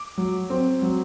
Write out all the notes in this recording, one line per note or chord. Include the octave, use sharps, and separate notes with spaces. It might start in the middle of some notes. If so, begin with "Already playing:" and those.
Already playing: D6
F#3
C4
F#3